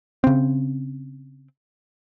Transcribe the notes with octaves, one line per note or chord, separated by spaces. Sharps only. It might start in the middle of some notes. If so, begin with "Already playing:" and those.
C#3 C4